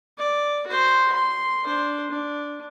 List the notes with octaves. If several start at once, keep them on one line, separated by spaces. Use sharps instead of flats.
D5
F#4 C5
C6
D4 C5
D4